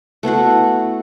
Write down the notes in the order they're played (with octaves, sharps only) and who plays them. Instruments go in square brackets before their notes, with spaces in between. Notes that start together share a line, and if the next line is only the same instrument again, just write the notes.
[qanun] A3 B3 E4 F#4